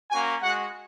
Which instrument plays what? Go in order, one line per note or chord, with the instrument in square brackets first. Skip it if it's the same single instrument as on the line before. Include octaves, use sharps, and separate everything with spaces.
[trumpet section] A#3 C#4 F#4 G#5
G#3 F#4 F#5